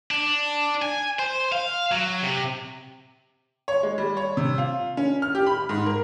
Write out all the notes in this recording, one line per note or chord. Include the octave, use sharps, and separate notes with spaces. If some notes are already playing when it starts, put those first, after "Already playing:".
D4
G#5
C5
F5
F#3
C3
C#5
G#3
G3
C#5
C3
F4
C#4
F6
G4
B5
G#2
A#4